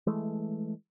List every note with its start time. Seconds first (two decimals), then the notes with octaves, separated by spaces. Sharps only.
0.07 E3 G#3 A3